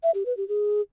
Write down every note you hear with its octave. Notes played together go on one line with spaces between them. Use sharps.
E5
G4
B4
G4
G#4